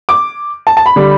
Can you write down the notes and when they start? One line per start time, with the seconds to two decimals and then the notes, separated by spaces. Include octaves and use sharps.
0.09 D6
0.67 A5
0.77 A5
0.86 B5
0.96 D3 G3